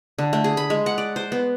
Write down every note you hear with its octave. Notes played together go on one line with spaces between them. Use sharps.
D3
A3
G#4
B5
G#3
F#5
D5
C5
B3